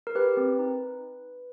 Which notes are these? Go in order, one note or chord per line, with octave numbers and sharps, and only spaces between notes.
A#4
G4 B4
C4
D#4